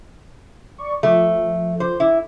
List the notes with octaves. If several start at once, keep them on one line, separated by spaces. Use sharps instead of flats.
D5 C#6
F3 A3
C5
E4